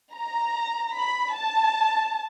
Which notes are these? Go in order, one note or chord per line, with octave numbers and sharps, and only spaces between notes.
A#5
B5
A5